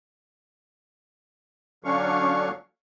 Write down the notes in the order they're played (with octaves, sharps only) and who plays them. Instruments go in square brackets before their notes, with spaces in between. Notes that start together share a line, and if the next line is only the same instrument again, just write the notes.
[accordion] D3 F#3 C#4 D4 F5 C#6